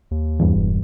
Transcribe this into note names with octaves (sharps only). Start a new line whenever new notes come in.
D#2
E2 G2
E1